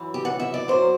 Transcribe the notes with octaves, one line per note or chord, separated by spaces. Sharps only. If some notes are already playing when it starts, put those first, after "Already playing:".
Already playing: F#2 E3
G4
F#5
E5
D5
F#2 F#3 C5